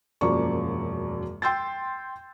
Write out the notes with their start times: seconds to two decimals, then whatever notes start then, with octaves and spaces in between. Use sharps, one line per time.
0.21 E1 F#2 F3 A#3 D5 C#6
1.42 G5 C6 E6 G6 A6